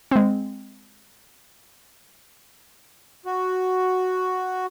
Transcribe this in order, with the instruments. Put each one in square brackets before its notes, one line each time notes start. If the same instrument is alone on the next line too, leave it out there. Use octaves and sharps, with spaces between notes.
[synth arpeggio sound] G#3 C4
[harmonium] F#4